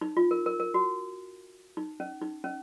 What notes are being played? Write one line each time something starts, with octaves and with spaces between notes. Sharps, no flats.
D#4
F4
A#4
A#4
A#4
F#4
D#4
C#4
D#4
C#4